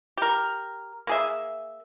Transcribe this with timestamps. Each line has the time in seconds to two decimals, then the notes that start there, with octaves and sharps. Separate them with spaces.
0.17 G4 A#4
1.07 A#3 G#4 E5